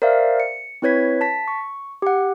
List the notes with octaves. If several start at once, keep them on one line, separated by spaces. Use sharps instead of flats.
A#4 C5 D5 E5 F5
C#7
C4 E4 B4 C#5 G#6 B6
A5 B6
C#6
G4 F#5